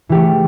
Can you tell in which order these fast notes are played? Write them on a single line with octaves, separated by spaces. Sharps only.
E3 G4 A3